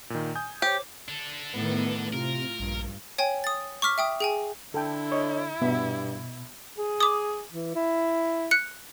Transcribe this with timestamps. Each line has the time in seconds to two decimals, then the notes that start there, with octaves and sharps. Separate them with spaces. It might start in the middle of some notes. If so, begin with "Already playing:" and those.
0.10 A#2 D#3
0.35 G#5 D#6 G6
0.62 G4 C5 C#5
1.08 D4 A4
1.53 A2 D#3 B3
2.13 C3 F4 A#4
2.59 A#1 G2
3.18 C#5 G5 G#5
3.44 D#6 A6
3.82 C#6 D6 F6 B6
3.98 E5 G5 D#6
4.20 G#4 G5 G#5
4.74 D3 E4 A4 G5
5.12 C#5 D#5
5.62 G2 B2 B3 E5
6.78 G#4
7.00 D6 D#6
7.52 E3
7.75 E4
8.51 F#6 C#7